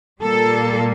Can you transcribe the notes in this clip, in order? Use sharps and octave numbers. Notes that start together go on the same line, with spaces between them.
A#2 G3 A#3 A4